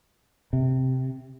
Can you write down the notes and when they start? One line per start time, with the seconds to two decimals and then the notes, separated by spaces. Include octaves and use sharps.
0.53 C3